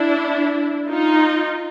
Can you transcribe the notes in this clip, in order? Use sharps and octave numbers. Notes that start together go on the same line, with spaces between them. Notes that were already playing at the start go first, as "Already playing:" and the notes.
Already playing: D4 E4
D#4 F4